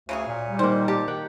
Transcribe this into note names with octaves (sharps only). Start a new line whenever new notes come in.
D2 C#3 F#3 G#4
A#2
G3
D#3 A#3 C5
G4 F5 A5
D#3 F#5 G5